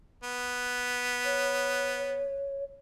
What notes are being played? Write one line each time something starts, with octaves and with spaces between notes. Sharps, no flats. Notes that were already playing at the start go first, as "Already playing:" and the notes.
B3
C#5